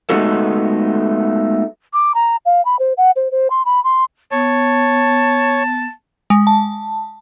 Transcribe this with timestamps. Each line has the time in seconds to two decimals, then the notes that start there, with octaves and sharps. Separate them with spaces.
0.10 G#3 A3 B3 D#4 F#4 A4
1.93 D6
2.15 A#5
2.46 F5
2.65 B5
2.79 C5
2.97 F#5
3.16 C5
3.32 C5
3.50 C6
3.65 B5
3.84 C6
4.32 B3 C#5 A5
6.30 G#3
6.47 A5